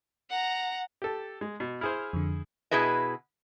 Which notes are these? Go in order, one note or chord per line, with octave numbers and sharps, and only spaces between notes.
F#5 A#5
G4 A4
G#3
B2
E4 G#4 C5 F6
F2 D3
B2 E4 G#4 B4 D#5